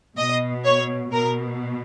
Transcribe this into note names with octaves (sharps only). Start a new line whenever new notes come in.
B2 D#5
C#5
B2 A#4